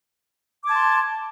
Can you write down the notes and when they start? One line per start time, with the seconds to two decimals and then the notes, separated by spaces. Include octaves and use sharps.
0.64 D6
0.67 G#6
0.71 A5
0.74 C6